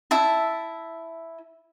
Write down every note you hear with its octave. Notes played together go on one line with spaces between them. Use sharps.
E4 E5 A5